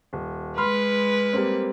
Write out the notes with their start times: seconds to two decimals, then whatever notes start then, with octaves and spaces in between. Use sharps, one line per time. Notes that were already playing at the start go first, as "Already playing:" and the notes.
0.13 D#1
0.58 G#3 B4 B5 C6 F6
1.33 G3 A#3 C4